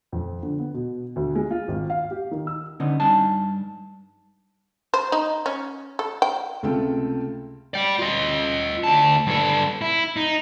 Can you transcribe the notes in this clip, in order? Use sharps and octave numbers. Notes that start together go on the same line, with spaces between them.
F2
D3
B3
B2
D2
G#3
F4
G#1
F5
G4
D#3
E6
D3 B3 C#4 D#4
G2 D#4 G#5 A5
C5
D#4
C#4
A4
G5
C#2 C3 A3 F4 A4 G5
D5 G5
F4 D#5
D2 A5
G2 A4
E4
D#4